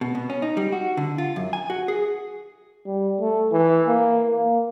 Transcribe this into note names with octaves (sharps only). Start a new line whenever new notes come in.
B2
B2
C#4
D#4
G3
F#4
D3
F4
F#2
G#5
F#4
G#4
G3
A3
E3
A#3
A#3